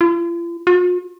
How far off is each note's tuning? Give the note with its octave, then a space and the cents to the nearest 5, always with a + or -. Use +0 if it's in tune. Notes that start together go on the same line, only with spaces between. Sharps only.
F4 -45
F4 +45